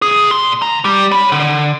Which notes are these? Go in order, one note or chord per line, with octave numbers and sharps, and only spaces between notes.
B1 G#4
A#2 C6
D2 A#5
G3
C#5 B5
D3